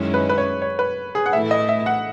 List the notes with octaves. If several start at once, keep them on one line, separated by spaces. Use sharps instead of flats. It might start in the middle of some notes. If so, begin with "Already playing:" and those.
Already playing: F#2 D#3 G#3 C#4 E4
B4
B4
C#5
C#5
B4
G#4
F#5
A2 E3 A3 E4 E5
D#5
E5
F#5